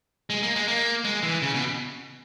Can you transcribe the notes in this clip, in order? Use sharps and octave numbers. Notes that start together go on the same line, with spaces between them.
G#3
A#3
G#3
A#3
G#3
E3
C#3
B2